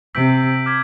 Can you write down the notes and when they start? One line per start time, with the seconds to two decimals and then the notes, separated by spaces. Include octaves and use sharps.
0.14 C3 E6 G6 B6 D7
0.66 D6 F6 G#6 B6